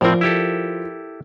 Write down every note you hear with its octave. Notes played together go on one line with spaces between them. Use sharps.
A2 F3 C4 A#4 C5 D5
E4 G4 A4